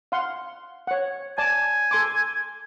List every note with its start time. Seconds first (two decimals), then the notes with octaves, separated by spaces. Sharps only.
0.12 F5 F#5 C6
0.87 C#5 F#5
1.38 D5 G#5 A5
1.91 A4 C6 D6